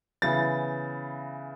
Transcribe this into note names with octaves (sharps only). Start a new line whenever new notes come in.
C#3 E3 B3 A6